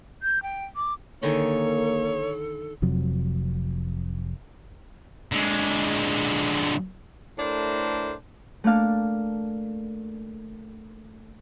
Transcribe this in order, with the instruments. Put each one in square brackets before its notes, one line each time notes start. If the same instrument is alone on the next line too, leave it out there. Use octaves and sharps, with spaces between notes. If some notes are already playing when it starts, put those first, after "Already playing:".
[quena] G6
G5
D6
[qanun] D3 D#3 G#4 [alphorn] A#3 [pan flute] A4 [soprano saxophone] C#5
[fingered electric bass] F1 F2 C3 F#3
[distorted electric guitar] D3 G#3
[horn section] A2 A3 D4 A#4 C5
[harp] A3 A#3 D4 F5 A5